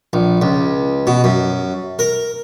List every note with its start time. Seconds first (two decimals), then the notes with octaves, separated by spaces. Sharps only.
0.13 A#1
0.42 C#2
1.07 B2
1.24 F#2
1.99 A#4